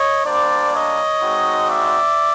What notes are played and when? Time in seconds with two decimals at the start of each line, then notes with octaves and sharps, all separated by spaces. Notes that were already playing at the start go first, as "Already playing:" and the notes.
Already playing: C#5 D#5
0.25 G3 A#3 D4 C5 D5
0.74 C#5 D#5
1.22 G#3 C4 D#4 F#4
1.69 D5 E5